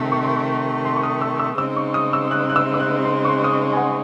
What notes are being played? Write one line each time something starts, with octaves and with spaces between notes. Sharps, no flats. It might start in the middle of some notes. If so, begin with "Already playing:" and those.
Already playing: C3 D#3 A3
C#6
C6
C#6
C6
C#6
D#6
E6
E6
C#3 G#3 C4 D#4 E6
C#6
D#6
E6
F#6
F#6
E6
E6
F#6
C6
C#6
C6
D#6
C#6
G#5
F#5